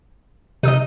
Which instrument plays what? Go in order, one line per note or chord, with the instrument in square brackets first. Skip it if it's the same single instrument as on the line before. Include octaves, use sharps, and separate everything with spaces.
[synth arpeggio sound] C3 D#6 [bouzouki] D#4 D#5